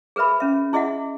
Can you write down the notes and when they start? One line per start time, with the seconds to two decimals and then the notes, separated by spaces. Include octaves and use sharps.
0.16 G#4 A#4 B4 E5 B5
0.40 C#4 E5
0.73 E4 G#4 D#5 E5 F#5